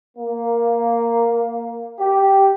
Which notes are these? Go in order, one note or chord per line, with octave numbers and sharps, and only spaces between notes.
A#3
G4